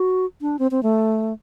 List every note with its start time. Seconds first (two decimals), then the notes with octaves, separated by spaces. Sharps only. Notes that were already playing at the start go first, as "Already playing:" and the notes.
Already playing: F#4
0.41 D4
0.59 C4
0.71 C4
0.83 A3